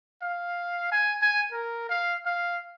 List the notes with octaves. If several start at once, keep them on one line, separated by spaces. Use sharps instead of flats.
F5
G#5
G#5
A#4
F5
F5